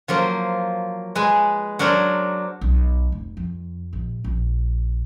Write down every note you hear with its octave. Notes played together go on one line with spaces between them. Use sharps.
F3 F#3 A#3 C5
G#3 B4 G#5
F#3 D4 A#4 C5 C#5
B1
F1
F2
A#1
A#1